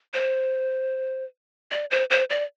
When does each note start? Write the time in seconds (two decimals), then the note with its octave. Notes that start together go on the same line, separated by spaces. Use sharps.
0.14 C5
1.71 D5
1.91 C5
2.10 C5
2.30 D5